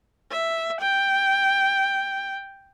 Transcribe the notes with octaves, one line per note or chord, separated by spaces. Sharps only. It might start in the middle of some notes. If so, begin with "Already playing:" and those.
E5
G5